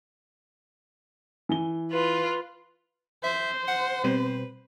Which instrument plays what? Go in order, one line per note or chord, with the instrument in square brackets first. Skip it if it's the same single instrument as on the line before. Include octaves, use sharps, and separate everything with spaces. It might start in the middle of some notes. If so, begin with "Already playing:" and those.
[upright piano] E3 G#5 G7
[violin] F4 B4
[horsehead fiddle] C5 [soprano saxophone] E5
[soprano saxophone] F#5
[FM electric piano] B2 G3 C4 [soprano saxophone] B4